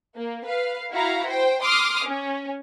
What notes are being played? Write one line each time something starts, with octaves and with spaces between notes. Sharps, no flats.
A#3
B4 F5
E4 F#4 F5 A#5
C5 G5
C6 D6 D#6 F6
C#4